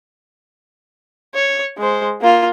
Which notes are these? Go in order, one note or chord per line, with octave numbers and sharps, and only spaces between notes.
C#5
G#3 C5
A#3 F4